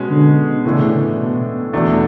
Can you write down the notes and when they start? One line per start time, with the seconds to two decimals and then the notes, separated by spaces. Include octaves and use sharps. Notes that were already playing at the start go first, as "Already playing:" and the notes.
Already playing: B2 G#3 C#4
0.10 D3
0.65 A2 C#3 E3 A3 D4
1.19 B2
1.73 E2 B2 A3 D4